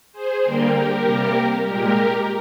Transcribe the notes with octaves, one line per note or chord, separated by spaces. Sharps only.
G#4 C5
D3 G3 A#3 G4 A#4
G4 A#4
C3 G3 A#3
A#2 G#3 G4 A#4